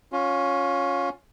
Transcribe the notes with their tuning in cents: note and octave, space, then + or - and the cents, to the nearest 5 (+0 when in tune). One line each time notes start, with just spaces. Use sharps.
C#4 +0 F4 +25